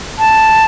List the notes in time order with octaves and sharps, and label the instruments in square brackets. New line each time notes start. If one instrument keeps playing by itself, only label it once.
[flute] A5